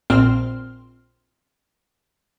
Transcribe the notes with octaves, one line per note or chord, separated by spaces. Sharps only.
A#1 A#2 C4 C6 F6